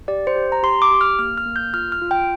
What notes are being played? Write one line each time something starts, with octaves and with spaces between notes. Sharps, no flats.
G4 D5
C5
G4
A#5
G4 C6
D6
G4
F6
A#3 F6
F6
A#3
G6
F4 F6
F6
F4
G5